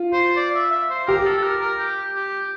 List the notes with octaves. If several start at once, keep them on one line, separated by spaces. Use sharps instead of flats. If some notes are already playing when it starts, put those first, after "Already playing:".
Already playing: F4
C5
D5
E5
E5
C5
G4 A#4
A4
A4
A#4
A#4
G4
G4